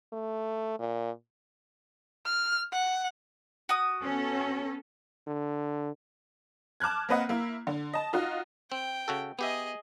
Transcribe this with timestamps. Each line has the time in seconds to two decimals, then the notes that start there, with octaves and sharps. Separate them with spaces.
0.13 A3
0.79 A#2
2.26 F6
2.72 F#5
3.69 F#4 D#6
4.03 B3 C#4 A4
5.27 D3
6.80 A5 D6 F6 F#6 G#6
7.09 A#3 C4 B4 D#5 F#5
7.29 A#3 E4
7.67 D3
7.93 D#5 A5
8.13 D#4 F4 F#4
8.72 C4 G5
9.08 C#3 F#4 A4
9.39 B3 G4 G#4 D#5 E5